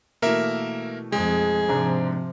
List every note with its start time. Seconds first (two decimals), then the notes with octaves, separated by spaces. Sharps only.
0.22 B2 E3 A3 A#3 A#4 E5
1.12 F2 G#3 G#4
1.69 G#2 C3 F3 D4 A#5